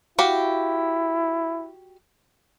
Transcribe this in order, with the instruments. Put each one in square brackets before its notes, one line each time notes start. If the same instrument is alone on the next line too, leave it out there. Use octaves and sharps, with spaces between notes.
[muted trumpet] E4 [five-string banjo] F#4 G4 F5